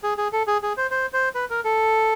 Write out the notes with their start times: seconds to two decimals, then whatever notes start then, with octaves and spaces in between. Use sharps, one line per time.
0.03 G#4
0.18 G#4
0.33 A4
0.47 G#4
0.63 G#4
0.77 C5
0.91 C5
1.13 C5
1.35 B4
1.50 A#4
1.64 A4